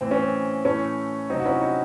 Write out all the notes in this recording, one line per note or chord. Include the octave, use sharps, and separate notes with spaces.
A2 E3 C4
C#4
C4
A2 E3 A3 C#4
C3 F#3 C4 D#4
F#4
C#4 E4
D#4 F#4